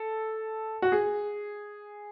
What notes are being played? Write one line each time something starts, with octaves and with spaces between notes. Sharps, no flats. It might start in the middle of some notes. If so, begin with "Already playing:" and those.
Already playing: A4
F#4
G#4